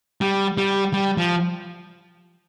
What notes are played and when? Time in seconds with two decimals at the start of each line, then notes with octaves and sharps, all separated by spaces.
0.21 G3
0.57 G3
0.93 G3
1.17 F3